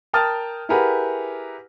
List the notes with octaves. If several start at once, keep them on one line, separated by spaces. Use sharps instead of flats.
A#4 G5 A5 D#6 F6 A6
E4 G4 G#4 A#4 B4 F#5